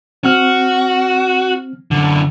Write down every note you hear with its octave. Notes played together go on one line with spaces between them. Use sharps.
C4 F#4 F6
F#2 D3